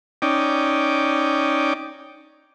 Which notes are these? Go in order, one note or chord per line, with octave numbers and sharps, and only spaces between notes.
C#4 D#4 D5 G5